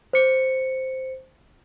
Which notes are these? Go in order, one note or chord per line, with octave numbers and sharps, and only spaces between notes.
C5 C#7